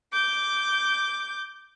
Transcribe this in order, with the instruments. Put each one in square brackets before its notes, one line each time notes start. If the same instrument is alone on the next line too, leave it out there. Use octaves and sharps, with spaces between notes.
[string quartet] D6 G6